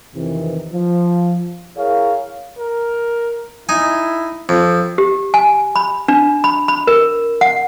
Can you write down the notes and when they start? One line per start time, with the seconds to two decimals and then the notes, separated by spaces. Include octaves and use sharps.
0.15 F2 C3 D#3 E3
0.72 F3
1.77 E4 G#4 A#4 C#5 F5
2.58 A#4
3.69 D#4 E4 G#5
4.49 F2 C4
4.98 G4
5.34 G#5
5.76 B5
6.08 D4
6.44 B5
6.68 B5
6.87 A#4
7.41 F#5